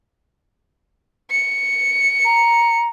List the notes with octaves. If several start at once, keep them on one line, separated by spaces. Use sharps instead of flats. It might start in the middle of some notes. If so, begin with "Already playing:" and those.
C#7
A#5